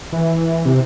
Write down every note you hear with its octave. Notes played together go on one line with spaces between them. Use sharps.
E3
C3